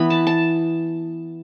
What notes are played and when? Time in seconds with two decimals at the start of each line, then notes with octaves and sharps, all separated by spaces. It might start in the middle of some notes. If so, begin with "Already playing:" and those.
Already playing: E3 B3 B5
0.10 A5
0.27 A5